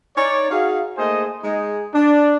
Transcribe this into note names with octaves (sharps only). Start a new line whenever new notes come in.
D#4 C#5 D5
D#4 F#4 G#4 F5
A3 A#3 D#4 G#4 C5 D#5
G#3 D#4 G#4
D4